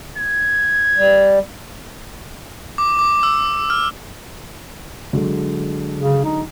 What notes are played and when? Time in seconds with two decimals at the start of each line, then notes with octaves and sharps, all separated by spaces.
0.18 G#6
0.98 G3
2.78 D6
2.99 D6
3.23 E6
3.70 F6
5.13 D3 F#3 G#3
5.98 C#3
6.24 D#4